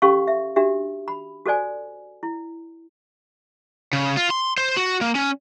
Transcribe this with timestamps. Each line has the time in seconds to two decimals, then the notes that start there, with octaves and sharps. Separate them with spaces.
0.02 C#4 G4 A4 F5 C6 C#6
0.28 E5
0.56 D4 F#4 G4 E5
1.08 B5
1.46 F#4 A4 C5 D5 G#5
2.23 E4
3.93 C#3
4.17 F4
4.30 C6
4.58 C5
4.77 F#4
5.01 A#3
5.15 C#4